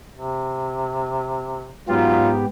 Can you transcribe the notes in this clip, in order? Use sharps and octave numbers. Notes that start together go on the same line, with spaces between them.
C3
G#2 F#3 B3 D#4 F4 G4